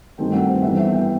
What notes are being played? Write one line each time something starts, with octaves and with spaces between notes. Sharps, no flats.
G2 D#3 F#3 A3 C4 G5
F#5
C5
G2 E3 B3 E5
E5
G5